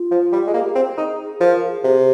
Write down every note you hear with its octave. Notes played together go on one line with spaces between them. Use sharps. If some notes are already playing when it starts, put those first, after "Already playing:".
Already playing: F4
F3
G3
G#3
A#3 G#4
G4
G#4
C4
D#4
F3 A#4
G#4
C3
G4